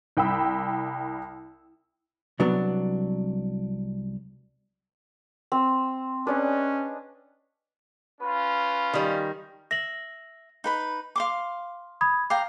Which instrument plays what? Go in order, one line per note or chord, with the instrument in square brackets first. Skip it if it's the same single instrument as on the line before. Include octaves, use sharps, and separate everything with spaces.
[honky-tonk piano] C2 G5 B5 E6
[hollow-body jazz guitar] C2 F#3 B3 D4
[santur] C4
[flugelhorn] C#4 [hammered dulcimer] D4 G#4 D#5 [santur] B4
[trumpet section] C#4 F4 [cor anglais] B4
[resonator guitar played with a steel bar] D#3 G3
[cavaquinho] E5 [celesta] A#6 F#7
[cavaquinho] D#4 B4 B5
F5 C6 D6
[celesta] B5 D#6 G#6
[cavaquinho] F5 G5 A#5 [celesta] D6